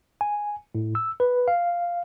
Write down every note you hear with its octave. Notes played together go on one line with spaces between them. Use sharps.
G#5
A2
E6
B4
F5